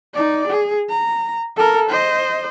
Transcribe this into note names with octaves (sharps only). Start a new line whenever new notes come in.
D#4 D5
G#4
A#5
A4 A#4
C5 D#5